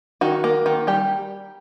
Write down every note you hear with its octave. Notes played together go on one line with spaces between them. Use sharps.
D#3 F#4
A#3
D#3
G3 G4